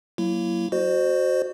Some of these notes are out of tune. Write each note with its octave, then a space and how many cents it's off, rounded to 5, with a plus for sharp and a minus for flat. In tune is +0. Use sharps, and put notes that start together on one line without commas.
F#3 +0 A#3 +0 E4 +20
F#4 +0 C5 +0 D#5 -45